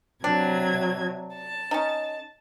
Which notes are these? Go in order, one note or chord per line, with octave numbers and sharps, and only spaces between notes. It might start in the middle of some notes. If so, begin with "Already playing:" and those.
C3 F#3 D4 G#6
A5
C#4 D#4